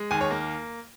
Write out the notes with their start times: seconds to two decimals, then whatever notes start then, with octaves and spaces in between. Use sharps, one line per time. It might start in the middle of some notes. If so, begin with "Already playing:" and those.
Already playing: G#3
0.11 D#2 G#5
0.21 C#5
0.31 A#3